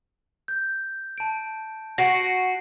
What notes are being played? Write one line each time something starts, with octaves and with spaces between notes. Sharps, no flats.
G6
A5 D7
F#4 A#6 C7 D7